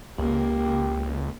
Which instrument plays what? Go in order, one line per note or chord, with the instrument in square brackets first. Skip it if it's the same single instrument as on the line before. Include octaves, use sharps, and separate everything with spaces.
[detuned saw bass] C#2 [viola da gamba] A#3 [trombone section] G4